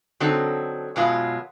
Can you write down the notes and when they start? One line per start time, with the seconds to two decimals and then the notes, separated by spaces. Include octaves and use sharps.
0.20 D3 F#3 C4 D#4 A4
0.96 F#2 B2 F#3 G#3 B3 F4